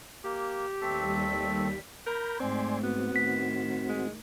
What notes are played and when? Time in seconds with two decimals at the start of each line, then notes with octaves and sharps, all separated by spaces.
0.24 A#3 G4
0.81 D#2 G3 A3 C4 A4 B6
2.06 A#4 A#5 B5 G6
2.40 G#2 A3 C4 D5 G#5 C6
2.83 B3 C4 F#4
3.16 A2 D#3 B6
3.88 G#3